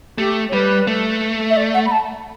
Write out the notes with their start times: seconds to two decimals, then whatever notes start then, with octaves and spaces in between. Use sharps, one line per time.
0.18 A3 G4
0.49 C#5
0.53 G3 B4
0.87 A3
1.50 E5
1.57 D5
1.74 F#5
1.86 B5
1.91 A5